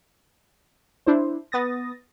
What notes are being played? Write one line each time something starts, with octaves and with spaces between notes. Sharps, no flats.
D4 E4 C5
B3 D#6 A6 A#6